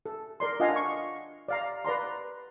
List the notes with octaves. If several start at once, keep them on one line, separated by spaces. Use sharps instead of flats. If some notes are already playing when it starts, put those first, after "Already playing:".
A4
A#4 D5 C6
D4 F4 D#5 F5 F#5 G#5
C#6
D5 F5 A#5
B4 D5 A#5 C6